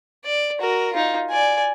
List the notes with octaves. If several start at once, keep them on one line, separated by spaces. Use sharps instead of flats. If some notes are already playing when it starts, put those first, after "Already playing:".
D5
F#4 A#4
D#4 F4
D5 G#5